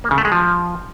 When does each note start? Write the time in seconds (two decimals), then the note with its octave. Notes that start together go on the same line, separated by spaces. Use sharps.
0.04 A#3
0.11 C#3
0.18 A3
0.25 G#3
0.32 F3